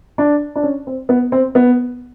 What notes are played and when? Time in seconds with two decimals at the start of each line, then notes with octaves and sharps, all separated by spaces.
0.18 D4
0.56 D4
0.63 C#4
0.87 C4
1.09 B3
1.32 C4
1.55 B3